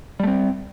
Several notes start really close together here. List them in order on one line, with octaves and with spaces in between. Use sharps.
G3 A3 C4